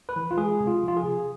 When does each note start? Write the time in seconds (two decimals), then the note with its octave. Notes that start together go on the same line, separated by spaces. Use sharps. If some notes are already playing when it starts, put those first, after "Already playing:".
0.09 B4
0.16 E3
0.31 F4
0.37 G#3 G#4
0.61 C3
0.67 F4
0.83 F3
0.88 F4
0.97 G#4
1.04 C3